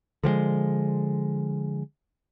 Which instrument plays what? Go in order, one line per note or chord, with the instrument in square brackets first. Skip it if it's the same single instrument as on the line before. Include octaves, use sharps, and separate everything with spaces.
[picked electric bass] D3 F3 G3 G#3